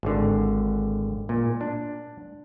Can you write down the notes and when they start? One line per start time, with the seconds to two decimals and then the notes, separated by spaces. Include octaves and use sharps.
0.03 G#1 D3
1.29 A#2
1.61 D4